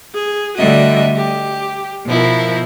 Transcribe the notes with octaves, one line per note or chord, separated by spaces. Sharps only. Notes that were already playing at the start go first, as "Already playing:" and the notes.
G#4
D3 G3 A3 F#4 D#5 E5
G4
B2 F3 E4 A#4